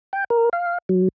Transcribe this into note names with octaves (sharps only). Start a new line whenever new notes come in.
G5
A#4
F5
F#3